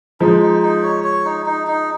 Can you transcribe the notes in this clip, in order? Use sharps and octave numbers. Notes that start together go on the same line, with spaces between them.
F3 G#3 D#4
D#4
D#4
C#5
C#5
D#4
D#4
D#4